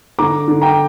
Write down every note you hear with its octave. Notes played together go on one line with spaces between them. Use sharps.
D3 A#5 D6
D3
G5 A#5